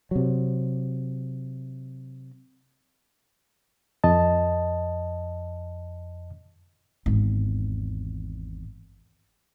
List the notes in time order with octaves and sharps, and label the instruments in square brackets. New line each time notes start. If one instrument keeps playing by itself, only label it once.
[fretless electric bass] C3 F#3
[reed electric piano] F2 D#5 A5
[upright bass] G#1 E2